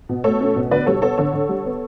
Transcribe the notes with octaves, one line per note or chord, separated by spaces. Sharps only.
B2
A3 A4 C#5
C#4
B2
D3 B4 D5
G3 A4 C#5
B3 A4 C#5
D3 A4 C#5
D3
G3
B3